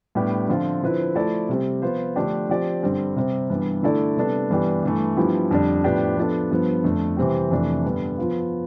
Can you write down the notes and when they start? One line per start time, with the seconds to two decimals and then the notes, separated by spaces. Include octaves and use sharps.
0.15 A2 G3 B3 D4 G4
0.49 D3 F3 C4 F4
0.82 D3 F3 C4 E4 B4
1.15 F3 A3 E4 A4 D5
1.49 C3 G3 C4
1.82 F3 B3 F4 C5
2.16 D3 F3 A3 D4 G4
2.49 F3 C4 G4 D5
2.83 G2 D3 G3 C4
3.16 C3 G3 C4
3.50 G2 E3 G3 B3
3.83 D3 A3 E4 A4 D5
4.17 C3 G3 B3 D4 A4
4.50 G2 E3 B3 D4 G4
4.83 G2 E3 A3
5.17 G2 F3 B3 E4 G4
5.51 F2 D3 G3 D4
5.84 A2 F3 B3 D4 G4
6.17 F3 B3 D4 A4
6.51 G2 F3 B3
6.84 F2 D3 A3
7.17 C3 E3 G3 C4 G4
7.51 F2 C3 E3 A3 D4
7.84 G2 D3 G3 B3
8.18 F3 B3 F4